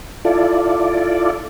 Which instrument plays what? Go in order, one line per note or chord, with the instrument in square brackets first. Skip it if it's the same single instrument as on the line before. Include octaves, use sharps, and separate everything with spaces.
[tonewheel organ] E4 F4 A4 D5